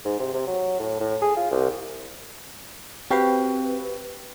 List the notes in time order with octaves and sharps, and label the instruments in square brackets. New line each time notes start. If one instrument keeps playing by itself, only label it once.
[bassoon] G#2
C3
C3
F#3
A2
A2
G#4
F4
C2
[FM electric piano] C4 B4 [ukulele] F#4 G4 F5